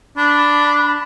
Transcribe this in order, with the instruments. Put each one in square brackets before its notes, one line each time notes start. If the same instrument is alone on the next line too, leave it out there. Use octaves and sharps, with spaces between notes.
[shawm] D4 [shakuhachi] B5